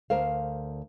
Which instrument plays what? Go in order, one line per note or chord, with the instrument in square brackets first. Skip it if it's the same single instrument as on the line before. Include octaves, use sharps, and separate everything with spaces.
[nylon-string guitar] D2 A#4 C5 F5